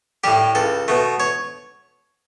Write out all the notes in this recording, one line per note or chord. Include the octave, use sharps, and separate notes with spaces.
A2 G3 G4
C#2 A4
B2 A3
C#5